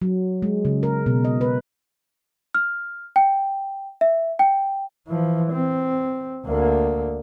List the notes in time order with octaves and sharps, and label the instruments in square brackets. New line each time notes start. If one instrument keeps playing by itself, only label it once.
[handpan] F#3
G#3
C#3
A#4
B2
D#5
B4
[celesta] F6
G5
E5
G5
[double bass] E3 F3
C4
D2 A#3